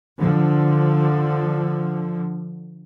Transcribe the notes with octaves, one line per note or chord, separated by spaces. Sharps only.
D3 F3